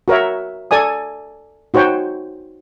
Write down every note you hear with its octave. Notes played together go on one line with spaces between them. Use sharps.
F#4 A#4 C#5 E5
A4 D5 G#5 D#6
D#4 F#4 C5 C#5 G5